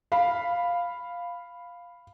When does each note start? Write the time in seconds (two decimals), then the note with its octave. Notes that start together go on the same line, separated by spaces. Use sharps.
0.12 F5 B5